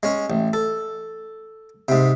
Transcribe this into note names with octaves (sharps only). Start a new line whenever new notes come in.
G#3 C#4
A1
A4
G#2 C3